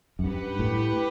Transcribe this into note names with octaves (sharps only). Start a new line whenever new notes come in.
F#2
G2 G4 B4 F#5
A2